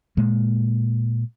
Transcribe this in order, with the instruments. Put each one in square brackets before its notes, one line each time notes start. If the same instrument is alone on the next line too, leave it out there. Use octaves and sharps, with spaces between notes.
[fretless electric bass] A#2 G#3 A#3